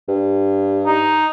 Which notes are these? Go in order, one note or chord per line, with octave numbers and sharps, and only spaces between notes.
G2
D#4